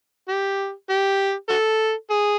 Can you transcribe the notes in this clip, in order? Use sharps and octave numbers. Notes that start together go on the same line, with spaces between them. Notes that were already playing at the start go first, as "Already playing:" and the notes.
G4
G4
F#4 A4
G#4